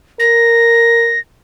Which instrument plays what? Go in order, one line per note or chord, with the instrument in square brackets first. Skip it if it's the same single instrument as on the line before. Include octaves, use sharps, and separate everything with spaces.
[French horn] A#4 [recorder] A#6